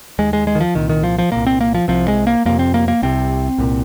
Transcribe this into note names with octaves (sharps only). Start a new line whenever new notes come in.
D#2 G#3
G#3
G#3
D#3
F3
C2 A#2 D#3
D#3
F3
F3
C2 A#2 A#3
C4
A#3
F3
C2 C3 F3
G#3
A#3
F2 C3 A#3
C4
A#3
A#3
C2 C3 C4
C2 A#2